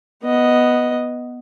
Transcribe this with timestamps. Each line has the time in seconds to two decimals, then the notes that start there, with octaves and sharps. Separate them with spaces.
0.24 B3 D#5